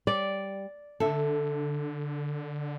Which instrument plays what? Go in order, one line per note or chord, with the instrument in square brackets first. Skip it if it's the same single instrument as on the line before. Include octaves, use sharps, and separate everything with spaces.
[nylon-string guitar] G3 [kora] D5
[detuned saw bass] D3 [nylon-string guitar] A4 E5